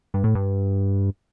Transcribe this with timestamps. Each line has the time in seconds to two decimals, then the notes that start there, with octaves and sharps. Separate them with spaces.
0.14 G2
0.24 A2
0.35 G2